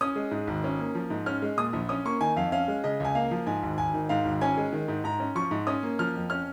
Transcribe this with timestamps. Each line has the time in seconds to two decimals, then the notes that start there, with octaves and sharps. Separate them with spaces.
0.01 C#4 D#6
0.16 G#3
0.31 G#2
0.47 G#1
0.64 C#4
0.79 A#3
0.95 F3
1.10 G#2
1.26 C#4 F6
1.42 G#3
1.57 A#2 D#6
1.73 A#1
1.89 C#4 D#6
2.05 A#3 C#6
2.20 D#3 G#5
2.36 F2 F5
2.52 C#4 F5
2.68 G#3
2.84 C#3 D#5
3.00 C#2 G#5
3.15 A#3 F5
3.31 F3
3.47 G#2 G#5
3.63 G#1
3.78 G#1 G#5
3.94 D#3
4.09 G#2 F5
4.25 G#1
4.41 C#4 G#5
4.57 G#3
4.72 D#3
4.88 G#2
5.04 G#2 A#5
5.20 C#4
5.35 F3 C#6
5.51 G#2
5.67 C#4 D#6
5.83 A#3
5.99 F3 F6
6.15 F2
6.30 C#4 F6